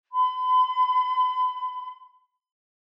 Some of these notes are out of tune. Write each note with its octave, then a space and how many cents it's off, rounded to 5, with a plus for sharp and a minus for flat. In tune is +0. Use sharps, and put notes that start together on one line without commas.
B5 +40